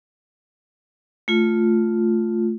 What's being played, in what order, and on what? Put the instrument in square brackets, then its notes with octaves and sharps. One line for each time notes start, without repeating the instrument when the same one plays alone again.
[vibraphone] A3 F4